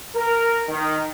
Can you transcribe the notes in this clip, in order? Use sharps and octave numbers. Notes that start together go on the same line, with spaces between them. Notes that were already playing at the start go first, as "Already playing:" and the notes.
A#4
D#3